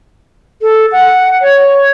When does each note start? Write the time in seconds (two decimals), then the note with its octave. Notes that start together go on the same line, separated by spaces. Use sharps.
0.62 A4
0.92 F#5
1.42 C#5